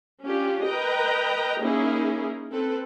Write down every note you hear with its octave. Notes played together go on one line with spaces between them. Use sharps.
C#4 D4 F4 G4
A#4 B4 D#5 G5 A#5
A#3 C#4 D#4 E4 G#4 A#4
C4 A4 B4